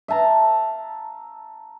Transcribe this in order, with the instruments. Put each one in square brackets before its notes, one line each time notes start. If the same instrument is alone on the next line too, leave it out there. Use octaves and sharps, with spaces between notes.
[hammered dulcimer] E5 F5 A5 A#5